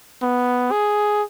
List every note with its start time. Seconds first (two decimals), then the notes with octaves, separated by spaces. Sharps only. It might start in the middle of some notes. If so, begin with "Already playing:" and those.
0.22 B3
0.71 G#4